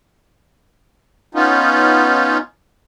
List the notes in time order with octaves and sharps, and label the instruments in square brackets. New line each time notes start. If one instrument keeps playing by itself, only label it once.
[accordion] B3 C#4 D#4 F4